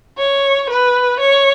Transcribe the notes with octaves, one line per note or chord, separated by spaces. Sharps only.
C#5
B4
C#5